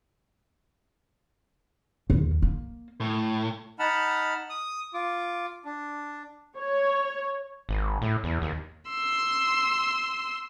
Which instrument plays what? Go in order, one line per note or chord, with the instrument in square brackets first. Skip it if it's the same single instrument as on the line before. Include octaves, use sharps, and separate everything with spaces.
[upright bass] D#2
A#3
[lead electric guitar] A2
[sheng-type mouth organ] D#4 F#5 A5 B5 F6
D#6
F4 D6
D4
[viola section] C#5
[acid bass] G#1
A2
E2
D#2
[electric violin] C6 E6